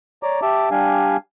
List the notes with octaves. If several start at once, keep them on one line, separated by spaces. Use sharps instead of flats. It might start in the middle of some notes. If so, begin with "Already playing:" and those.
C#5 D5 A#5 D6
G4 E5 A5 D6
G3 D4 G4 F5 G#5